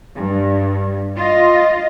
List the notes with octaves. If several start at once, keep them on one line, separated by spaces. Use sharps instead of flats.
G2
F4 D#5